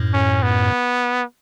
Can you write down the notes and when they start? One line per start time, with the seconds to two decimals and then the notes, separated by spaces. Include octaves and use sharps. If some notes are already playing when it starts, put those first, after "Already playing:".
Already playing: F#2 A2
0.14 C#4
0.43 B3